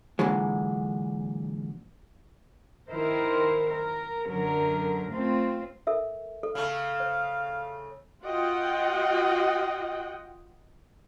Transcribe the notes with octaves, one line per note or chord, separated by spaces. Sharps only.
A#2 D3 E3 F#3 G#3
D#3 E4 A#4 C5
A#4
F#2 D3 F#3 A#4
A3 C4 F4
A4 A#4 E5
A4
C#3 A3 F5
C5
F4 F#4 D#5 F#5 G5